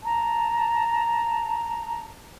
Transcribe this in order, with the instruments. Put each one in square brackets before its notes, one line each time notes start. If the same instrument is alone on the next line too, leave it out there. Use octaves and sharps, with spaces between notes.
[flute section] A5 A#5